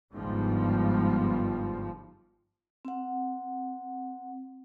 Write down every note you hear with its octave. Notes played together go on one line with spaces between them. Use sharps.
G1 G#2 F3 G3
C4 F#5